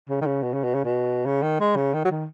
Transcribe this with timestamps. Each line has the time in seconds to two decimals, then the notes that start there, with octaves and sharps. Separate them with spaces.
0.09 C#3
0.21 D#3
0.26 C#3
0.43 B2
0.53 C#3
0.64 B2
0.74 C#3
0.85 B2
1.26 C#3
1.42 D#3
1.60 G#3
1.76 C#3
1.94 D#3
2.05 F#3
2.11 D#3